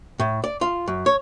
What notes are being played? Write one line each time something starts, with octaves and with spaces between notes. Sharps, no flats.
A2
D5
F4
F#2
C#5